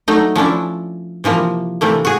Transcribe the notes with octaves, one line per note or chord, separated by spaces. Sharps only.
F#3 A3 D#4
F3 C#4 D4 E4
C3 E3 F3 A#3
C3 E3 A3 A#3
F#4 G#4